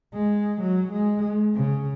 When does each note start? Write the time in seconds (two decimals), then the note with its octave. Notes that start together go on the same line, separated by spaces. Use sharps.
0.14 G#3
0.61 F#3
0.92 G#3
1.56 C#3